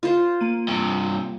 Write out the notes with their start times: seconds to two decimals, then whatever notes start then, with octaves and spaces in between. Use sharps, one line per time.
0.03 F4 C5
0.41 A#3 D#7
0.68 G2 C3